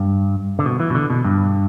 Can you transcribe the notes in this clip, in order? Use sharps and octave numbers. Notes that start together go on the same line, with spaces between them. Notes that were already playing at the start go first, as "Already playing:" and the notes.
Already playing: G2
D3
B2
E3
B2
D3
B2
G2